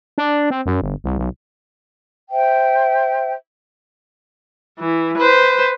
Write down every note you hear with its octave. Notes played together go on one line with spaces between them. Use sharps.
D4
C4
F#2
G1
C2
B1
C5 E5 G5
E3
B4 C5